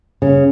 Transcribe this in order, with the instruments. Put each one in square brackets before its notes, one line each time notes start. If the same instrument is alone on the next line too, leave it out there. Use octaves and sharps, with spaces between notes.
[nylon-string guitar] C#3